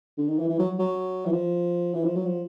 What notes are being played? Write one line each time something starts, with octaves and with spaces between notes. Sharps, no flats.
D3
D#3
E3
E3
F#3
F#3
E3
F3
E3
F3
F#3
F3